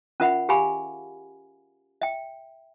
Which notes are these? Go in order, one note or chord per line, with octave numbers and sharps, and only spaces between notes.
C#4 F4 A#4 E5 F#5 B5
G4 G#4 F5 G#5 B5
E5 G5